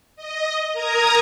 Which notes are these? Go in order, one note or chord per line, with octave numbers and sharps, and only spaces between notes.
D#5
A#4 A#5 D#6 G#6